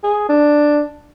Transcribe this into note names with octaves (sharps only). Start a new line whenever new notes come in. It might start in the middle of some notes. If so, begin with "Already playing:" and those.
G#4
D4